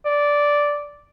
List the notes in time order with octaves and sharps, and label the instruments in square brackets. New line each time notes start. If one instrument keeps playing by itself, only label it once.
[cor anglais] D5